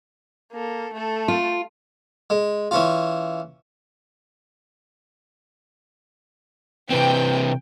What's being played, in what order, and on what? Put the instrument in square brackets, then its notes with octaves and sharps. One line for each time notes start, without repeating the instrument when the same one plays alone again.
[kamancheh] A#3 A4
A3 A4
[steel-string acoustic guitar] F4
[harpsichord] G#3
E3 C#4 F4
[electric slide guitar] C3 E3 C4 [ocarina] B4 [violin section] G5